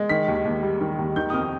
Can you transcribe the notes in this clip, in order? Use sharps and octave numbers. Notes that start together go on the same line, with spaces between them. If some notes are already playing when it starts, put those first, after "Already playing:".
Already playing: G#3
D#3 B6
D#2
D#2
G3
D#3
D#2
D#3 G6
D#6
F2 F6